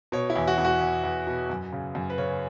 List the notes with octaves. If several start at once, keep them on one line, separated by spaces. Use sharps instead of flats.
B2 C#5
E4
E2
F#4
E2
F#4
E2
E2
B2
F#2
C#3
F#2
B4
C#3 C#5